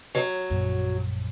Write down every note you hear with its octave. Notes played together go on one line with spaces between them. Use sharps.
F#3
A#1 F#2